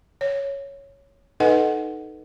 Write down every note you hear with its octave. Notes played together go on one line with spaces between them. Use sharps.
C#5
D#4 A4 B4 D#5 F#5 G#5